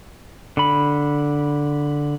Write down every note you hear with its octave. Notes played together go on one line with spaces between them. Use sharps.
D3 B5